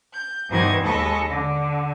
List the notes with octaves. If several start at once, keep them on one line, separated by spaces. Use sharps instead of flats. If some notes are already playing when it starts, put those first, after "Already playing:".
G6
G2 B2 D#3 E3 C5 G#6
D#2 G#3 A4 D#5 B5 C#6
D3